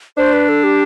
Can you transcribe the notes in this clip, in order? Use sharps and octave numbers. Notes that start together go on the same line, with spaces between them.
D4 C5
B4
A4
G4